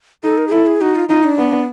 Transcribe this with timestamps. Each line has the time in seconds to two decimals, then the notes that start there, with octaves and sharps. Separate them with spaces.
0.24 D#4 A4
0.38 A#4
0.47 G#4
0.52 E4 A4
0.67 G#4
0.81 D#4 F#4
0.96 F4
1.09 D#4 F4
1.23 D4
1.39 B3